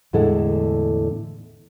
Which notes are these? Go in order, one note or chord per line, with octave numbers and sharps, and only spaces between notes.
E2 A2 D3 G#3 A4 F#5